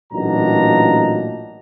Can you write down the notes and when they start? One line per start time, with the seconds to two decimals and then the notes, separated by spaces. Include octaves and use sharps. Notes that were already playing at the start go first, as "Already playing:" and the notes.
0.13 A1 A#2 F#3 D4 D#4 A#5